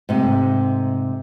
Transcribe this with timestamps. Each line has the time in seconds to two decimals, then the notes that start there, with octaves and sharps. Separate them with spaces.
0.09 G#2 C3 A3